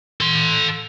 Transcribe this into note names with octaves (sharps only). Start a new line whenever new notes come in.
A4 C6